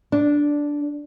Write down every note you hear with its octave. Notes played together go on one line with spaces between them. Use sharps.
D4